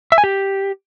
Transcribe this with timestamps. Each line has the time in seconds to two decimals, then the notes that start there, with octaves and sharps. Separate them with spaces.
0.12 E5
0.18 G#5
0.24 G4